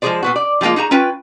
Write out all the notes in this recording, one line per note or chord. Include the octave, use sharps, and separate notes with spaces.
F3 G#3 G4 G#4 C5 D5
A#2 B3 F#4
D5
F3 G3 G#3 A#3 F4
D#4 F#4 G#4 A#5
C#4 F4 B4 G5